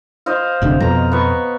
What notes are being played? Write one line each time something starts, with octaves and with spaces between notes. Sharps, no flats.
C5 D#5 F5
F#1 D2 C3
F2 B2 A#5
B3 C#6